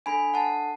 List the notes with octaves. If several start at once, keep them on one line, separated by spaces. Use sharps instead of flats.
D4 A4 G#5 B5
F#5 A5